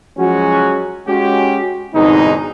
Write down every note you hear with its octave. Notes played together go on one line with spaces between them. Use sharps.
F3 F#3 G#3 C#4 F#4
G#3 C#4 F#4 G4
G1 E2 B2 G#3 C4 D#4